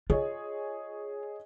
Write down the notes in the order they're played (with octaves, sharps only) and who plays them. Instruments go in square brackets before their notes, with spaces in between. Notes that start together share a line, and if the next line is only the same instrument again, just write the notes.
[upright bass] F4 [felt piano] G#4 C#5 D#5